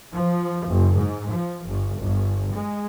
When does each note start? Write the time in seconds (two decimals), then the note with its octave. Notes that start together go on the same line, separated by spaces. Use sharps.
0.11 F3
0.65 F#1
0.96 G#2
1.30 F3
1.66 G1
2.00 G1
2.53 G#3